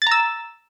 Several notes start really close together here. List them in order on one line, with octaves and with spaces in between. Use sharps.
A6 A#5 E6